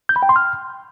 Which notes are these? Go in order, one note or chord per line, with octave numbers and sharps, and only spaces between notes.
G6
B5
G5
C6
F6